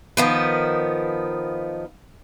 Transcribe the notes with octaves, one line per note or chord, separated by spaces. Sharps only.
D#3 F3 B3